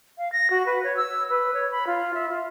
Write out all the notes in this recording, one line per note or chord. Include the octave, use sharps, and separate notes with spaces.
F5
A#6
F#4
B4
C#5
E6
B4
C#5
B5
F4
E5
F4